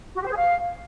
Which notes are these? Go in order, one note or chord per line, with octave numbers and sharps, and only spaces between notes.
F#4
G4
C5
G#4
F5